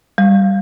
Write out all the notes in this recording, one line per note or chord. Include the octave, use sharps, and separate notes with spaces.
G3